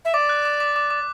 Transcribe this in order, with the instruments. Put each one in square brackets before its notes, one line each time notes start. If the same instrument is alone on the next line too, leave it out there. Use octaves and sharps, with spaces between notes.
[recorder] E5
[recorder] D5 [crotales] D6
[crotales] F#6
D6
D6
D6
D6